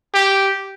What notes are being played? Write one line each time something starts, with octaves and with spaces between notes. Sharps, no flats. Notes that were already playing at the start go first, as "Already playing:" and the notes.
G4